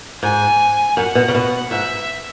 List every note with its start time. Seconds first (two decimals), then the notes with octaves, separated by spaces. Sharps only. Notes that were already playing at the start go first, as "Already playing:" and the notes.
0.23 G#2 G#5
0.97 F#2 F#5
1.15 B2
1.28 C#3
1.35 B2
1.71 G#2 E5